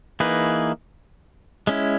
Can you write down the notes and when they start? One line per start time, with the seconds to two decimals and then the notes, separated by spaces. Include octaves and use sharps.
0.20 E3 A#3 D#4 G#4 B4
1.67 G#3 C#4 E4